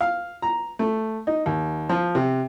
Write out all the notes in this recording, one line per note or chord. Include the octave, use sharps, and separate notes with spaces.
F5
A#5
A3
D#4
D#2
F3
C3